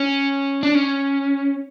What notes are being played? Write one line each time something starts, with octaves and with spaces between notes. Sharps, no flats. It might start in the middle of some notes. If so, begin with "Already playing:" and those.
Already playing: C#4
D4
C#4